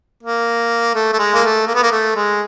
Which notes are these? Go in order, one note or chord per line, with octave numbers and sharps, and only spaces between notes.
A#3
A3
A3
G#3
A#3
A3
A#3
B3
A#3
A3
G#3